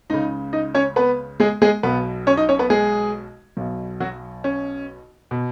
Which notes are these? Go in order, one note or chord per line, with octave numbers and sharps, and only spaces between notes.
C#2 C#3 D#4 D#5
D#4 D#5
C#4 C#5
B3 B4
G#3 G#4
G#3 G#4
B1 B2 B3 B4
C#4 C#5
D#4 D#5
C#4 C#5
B3 B4
G#3 G#4
B1 B2
F#3 F#4
C#4
B2